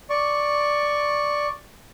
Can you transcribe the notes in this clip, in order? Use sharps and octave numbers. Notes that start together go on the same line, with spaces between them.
D5 C#6